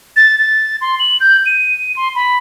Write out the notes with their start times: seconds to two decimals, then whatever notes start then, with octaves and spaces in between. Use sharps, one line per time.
0.16 A6
0.38 A6
0.81 C6
0.99 F#7
1.20 G6
1.46 D#7
1.96 C6
2.15 B5